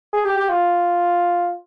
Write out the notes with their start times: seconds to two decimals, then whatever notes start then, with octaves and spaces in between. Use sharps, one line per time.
0.13 G#4
0.25 G4
0.37 G4
0.49 F4